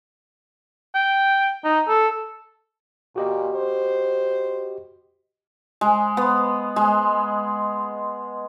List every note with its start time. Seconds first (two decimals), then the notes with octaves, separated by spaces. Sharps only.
0.95 G5
1.64 D#4
1.88 A4
3.16 A#2 F#4 G4 D#5
3.55 C5
5.81 G#3
6.17 B3
6.76 G#3